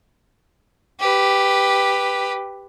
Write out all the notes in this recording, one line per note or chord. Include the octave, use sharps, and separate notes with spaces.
G4 B4